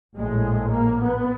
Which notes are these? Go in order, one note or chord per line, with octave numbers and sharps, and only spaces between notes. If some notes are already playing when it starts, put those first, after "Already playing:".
A#1 A2 G#3
A#3
B3